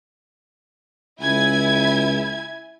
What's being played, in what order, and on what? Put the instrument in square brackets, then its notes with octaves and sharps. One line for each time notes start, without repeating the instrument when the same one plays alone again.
[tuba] C#2 [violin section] E4 G#5 G#6